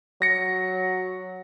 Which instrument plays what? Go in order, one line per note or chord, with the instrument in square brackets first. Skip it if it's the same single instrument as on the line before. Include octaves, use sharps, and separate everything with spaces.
[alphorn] F#3 [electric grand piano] A#6 C#7